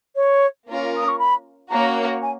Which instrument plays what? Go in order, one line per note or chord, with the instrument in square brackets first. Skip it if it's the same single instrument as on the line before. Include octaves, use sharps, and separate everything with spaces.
[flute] C#5
[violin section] A#3 C#4 F4 A#4
[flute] D#6
C#6
B5
[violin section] A#3 C#4 F#4 C#5 [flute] A#5
[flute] G#5